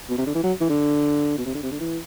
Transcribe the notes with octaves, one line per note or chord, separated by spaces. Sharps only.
B2
C3
D3
E3
F#3
E3
D3
B2
C3
D3
C3
D3
E3